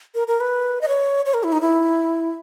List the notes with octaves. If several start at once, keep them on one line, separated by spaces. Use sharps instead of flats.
A#4
A#4
B4
D#5
C#5
C#5
A#4
E4
D#4
E4